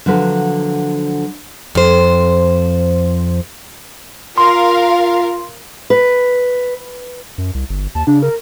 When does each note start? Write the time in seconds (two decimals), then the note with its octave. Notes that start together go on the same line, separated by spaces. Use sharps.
0.06 D3 F3 F#3 B4
1.75 F2 C5
4.38 F4 A#4 F5 C6
5.90 B4
7.38 F#2
7.54 C2
7.70 G1
7.95 D#2 A5
8.07 C#3 D4
8.23 A#4